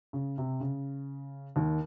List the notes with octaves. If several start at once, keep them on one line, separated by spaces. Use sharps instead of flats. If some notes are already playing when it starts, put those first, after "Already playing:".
C#3
C3
C#3
D#2 D#3